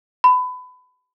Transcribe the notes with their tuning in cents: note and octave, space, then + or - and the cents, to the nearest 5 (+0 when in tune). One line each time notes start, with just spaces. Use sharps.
B5 +25